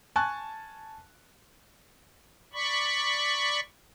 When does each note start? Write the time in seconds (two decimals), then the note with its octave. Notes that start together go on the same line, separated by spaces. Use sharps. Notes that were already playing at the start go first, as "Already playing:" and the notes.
0.16 G#5 A5 C#6 F#6
2.53 D5 B5 C#6